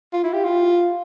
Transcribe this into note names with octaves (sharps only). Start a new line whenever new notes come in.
F4
E4
G4
F4